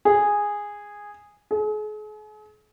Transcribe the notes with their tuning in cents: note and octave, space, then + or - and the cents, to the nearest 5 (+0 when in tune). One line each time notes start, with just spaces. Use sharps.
G#4 -10
G#4 +40